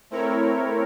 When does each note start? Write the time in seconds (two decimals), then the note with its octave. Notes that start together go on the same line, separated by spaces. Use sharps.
0.11 A3 C4 E4 A#4 C#5